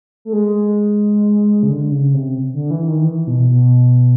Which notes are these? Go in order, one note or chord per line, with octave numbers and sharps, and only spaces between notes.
A3
G#3
C#3
D3
C#3
C3
D3
E3
D#3
E3
B2
B2